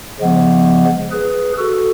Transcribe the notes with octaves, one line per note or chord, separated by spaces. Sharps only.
C#3 F3 G#3 B3
G#4 B4
F#4 A4